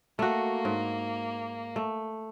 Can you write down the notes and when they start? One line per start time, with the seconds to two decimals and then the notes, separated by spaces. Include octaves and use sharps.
0.19 A3 A#3 F#4
0.65 G#2
1.76 A3